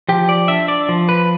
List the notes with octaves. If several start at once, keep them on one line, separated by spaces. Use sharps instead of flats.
F3 G4
D5
D4 E5
D5
F3
B4